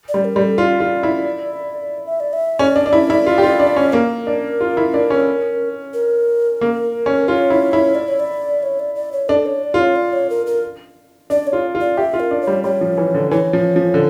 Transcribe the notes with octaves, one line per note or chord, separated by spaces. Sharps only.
D5
G3
A#4
G3
A4
F4 D5
F4
E4
E5
D5
E5
C#4 D5
D4
D4
E4
E4
F4
G4
F4
D4
C#4
A#3 A#4
D4
F4
E4
D4
C#4
A#4
A#3
C#4
F4 C#5
E4
E4
D5
C#5
D5
C#5
D5
D5
C#5
D4 A4
C#5
D5
F4
C#5
D5
C#5
A#4
A#4
D4 D5
C#5
F4
F4
D5
G4 E5
F4
A#4
D4
C#5
G3
G3 C#5
F3
E3
D3
E3 C#5
F3
F3
D3